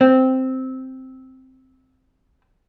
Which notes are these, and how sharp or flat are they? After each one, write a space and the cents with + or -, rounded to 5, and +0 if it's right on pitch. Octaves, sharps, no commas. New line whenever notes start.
C4 -5